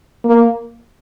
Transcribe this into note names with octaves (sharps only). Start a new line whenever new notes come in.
A#3